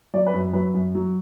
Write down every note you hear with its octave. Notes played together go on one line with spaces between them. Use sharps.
F#3 D5
B4
F#2
F#3 B4
F#2
F#3